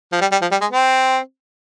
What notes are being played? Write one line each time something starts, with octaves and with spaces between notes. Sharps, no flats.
F3
G3
G3
F3
G3
G#3
C4